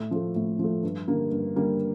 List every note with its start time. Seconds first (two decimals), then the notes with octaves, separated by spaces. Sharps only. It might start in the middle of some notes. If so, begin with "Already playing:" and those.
Already playing: A2
0.11 F3 A3
0.36 A2
0.59 F3 A3
0.83 G2
1.08 D3 G3 A#3
1.31 G2
1.56 D3 G3 A#3